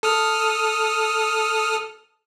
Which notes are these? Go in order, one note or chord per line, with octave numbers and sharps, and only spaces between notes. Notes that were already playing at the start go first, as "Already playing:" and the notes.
A4 D#6 F6